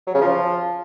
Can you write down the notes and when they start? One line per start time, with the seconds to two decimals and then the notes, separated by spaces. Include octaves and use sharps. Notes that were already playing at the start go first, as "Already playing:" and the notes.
0.07 F#3
0.14 C#3
0.21 F3